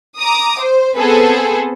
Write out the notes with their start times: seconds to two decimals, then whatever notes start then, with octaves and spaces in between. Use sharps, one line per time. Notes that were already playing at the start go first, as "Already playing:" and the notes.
0.18 A#5 D6 D#6
0.60 C5
0.97 B3 C4 G#4 A4 B4